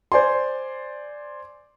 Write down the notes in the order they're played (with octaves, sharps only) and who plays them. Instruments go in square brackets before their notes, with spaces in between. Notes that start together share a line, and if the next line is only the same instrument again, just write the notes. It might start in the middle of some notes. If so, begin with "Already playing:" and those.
[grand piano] C5 D5 G#5 C6